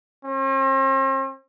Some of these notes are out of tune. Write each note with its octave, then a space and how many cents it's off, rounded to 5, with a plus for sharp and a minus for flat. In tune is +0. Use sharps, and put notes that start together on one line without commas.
C4 +45